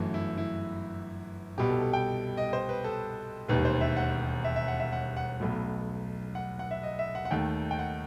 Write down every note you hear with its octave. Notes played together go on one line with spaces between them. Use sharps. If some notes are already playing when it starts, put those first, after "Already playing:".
Already playing: G1 F#2 E3 A3 F#4
E4
E4
C2 B2 G3 G4
A4
A4
G5
D#5
C5
B4
A4
E1 D#2 D#3 G3 B4
C5
E5
F#5
E5
E5
F#5
E5
F#5
F#5
B1 B2 A3
F#5
F#5
E5
D#5
E5
F#5
F#5
D#2 D#3 A3 G5
G5
F#5